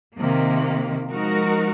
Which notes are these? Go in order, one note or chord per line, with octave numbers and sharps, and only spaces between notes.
C3 D#3 A#3
F3 G#3 D#4 F#4 A#4